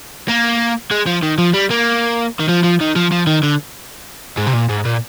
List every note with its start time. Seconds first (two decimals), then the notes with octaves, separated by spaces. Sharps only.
0.28 A#3
0.91 G#3
1.07 F3
1.23 D#3
1.38 F3
1.54 G3
1.70 A#3
2.40 D#3
2.49 F3
2.64 F3
2.81 D#3
2.96 F3
3.12 F3
3.27 D#3
3.43 D3
4.37 G#2
4.47 C3
4.54 A#2
4.69 G#2
4.85 A#2